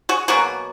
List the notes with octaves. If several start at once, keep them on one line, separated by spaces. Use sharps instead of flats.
F#4 G#4
B2 F#3 A#3 F#4 G#4